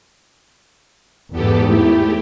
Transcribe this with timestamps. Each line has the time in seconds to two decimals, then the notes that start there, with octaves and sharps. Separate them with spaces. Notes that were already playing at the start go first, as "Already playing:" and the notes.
1.32 E2 G#2 B3 G4 A4
1.67 A3 E4 G4